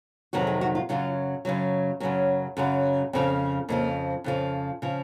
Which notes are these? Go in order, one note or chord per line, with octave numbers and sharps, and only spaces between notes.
F2 C3 D#3 F#3 F#4
G#4
F#4
F4
F#2 C#3 F#3 F4
F#2 C#3 F#3
F#2 C#3 F#3 C#4
F#2 C#3 F#3
F2 C#3 F3 C4
F2 C#3 F3 A#3
F2 C#3 F3
C#3 F3